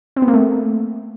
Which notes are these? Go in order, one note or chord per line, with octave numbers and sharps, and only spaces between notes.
C4
B3
A#3
A3